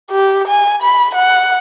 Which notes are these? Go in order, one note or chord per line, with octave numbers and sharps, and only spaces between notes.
G4
G#5
B5
F#5